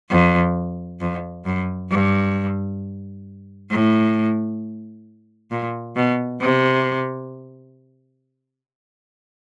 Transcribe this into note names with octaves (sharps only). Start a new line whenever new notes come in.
F2
F2
F#2
G2
A2
A#2
B2
C3